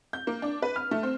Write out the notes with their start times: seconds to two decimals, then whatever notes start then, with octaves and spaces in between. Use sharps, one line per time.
0.13 G6
0.27 A#3
0.42 D4
0.62 B4
0.76 F6
0.91 A3
1.03 C4